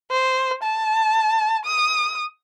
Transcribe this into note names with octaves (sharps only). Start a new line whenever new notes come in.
C5
A5
D#6